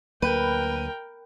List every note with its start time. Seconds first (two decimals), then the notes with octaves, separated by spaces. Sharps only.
0.22 D2 F#3 A#3 A#4 B4 G5